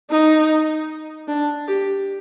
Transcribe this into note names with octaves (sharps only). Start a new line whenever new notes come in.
D#4
D4
G4